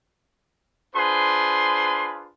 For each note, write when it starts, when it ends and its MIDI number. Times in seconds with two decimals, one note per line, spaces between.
0.95 2.30 62
0.95 2.30 65
0.95 2.30 68
0.95 2.30 71
0.95 2.30 72
0.95 2.30 84